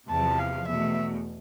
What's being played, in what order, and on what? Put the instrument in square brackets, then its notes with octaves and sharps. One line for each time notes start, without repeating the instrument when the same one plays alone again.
[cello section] E2 C3 F3 [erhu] A5
[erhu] F5
[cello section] E2 B2 A3 [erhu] E5